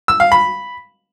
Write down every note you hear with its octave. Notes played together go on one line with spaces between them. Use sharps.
E6
F5
B5